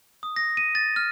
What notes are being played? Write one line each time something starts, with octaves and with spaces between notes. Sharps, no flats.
D#6
A#6
D#7
A6
F6